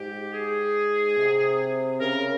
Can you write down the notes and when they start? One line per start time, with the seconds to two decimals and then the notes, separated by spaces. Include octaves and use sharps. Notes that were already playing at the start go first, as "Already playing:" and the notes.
Already playing: G#2 G4
0.34 G#4
1.17 C3
1.99 C#3 A#4